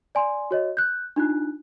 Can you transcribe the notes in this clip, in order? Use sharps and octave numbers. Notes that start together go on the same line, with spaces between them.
D5 G#5 C6
F#4 C#5 D#5
F#6 G6
D4 D#4 F4 F#6